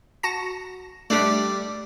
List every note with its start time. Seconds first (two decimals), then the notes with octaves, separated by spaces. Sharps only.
0.23 F#4 A5 A#6
1.10 G3 A3 D4 G4 D5